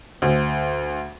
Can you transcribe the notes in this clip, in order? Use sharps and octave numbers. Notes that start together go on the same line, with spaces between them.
D2